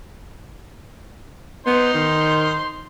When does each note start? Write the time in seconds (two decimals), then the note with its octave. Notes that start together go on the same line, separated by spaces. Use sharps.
1.67 B3 D#4 C5 C6
1.94 D#3